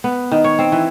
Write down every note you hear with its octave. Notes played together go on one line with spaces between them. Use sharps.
B3
D#3
C#5
C4
E3